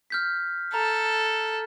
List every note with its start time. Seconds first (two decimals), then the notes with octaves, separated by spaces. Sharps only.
0.10 F6 G6 B6
0.74 A4 A#5